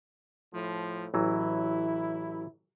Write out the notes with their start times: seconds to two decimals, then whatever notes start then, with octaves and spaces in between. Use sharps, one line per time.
0.54 A2 F3
1.14 A1 E3 F#3 E4